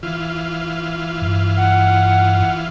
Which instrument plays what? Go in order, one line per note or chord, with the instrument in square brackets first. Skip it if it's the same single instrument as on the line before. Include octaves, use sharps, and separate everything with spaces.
[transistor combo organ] E3 F4
[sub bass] G2
[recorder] F#5